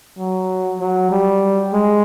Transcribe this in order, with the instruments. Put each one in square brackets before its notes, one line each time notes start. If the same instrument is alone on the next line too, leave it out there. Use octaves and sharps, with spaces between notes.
[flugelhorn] F#3
F#3
G3
G#3